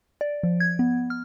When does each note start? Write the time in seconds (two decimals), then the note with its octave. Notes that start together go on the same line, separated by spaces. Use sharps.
0.21 D5
0.43 F3
0.60 G#6
0.79 B3
1.10 F6